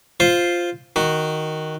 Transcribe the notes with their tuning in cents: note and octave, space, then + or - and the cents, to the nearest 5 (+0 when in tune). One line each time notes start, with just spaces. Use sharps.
F4 +0 C5 +0
D#3 +0 F#4 +0